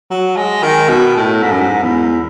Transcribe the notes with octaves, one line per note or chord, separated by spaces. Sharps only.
F#3
G#3
D#3
B2
A2
G#2
F#2
G#2
E2